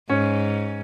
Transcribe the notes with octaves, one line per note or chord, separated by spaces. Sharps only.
G#2 C#4